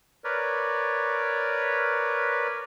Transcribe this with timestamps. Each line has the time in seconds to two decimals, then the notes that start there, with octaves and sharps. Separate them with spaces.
0.24 A#4 B4 C#5 D5